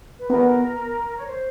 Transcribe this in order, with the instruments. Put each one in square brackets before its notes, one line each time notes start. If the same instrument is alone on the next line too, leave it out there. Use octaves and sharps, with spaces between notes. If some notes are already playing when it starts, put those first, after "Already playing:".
[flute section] B4
[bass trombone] B3 [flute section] A#4
[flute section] C#5
C5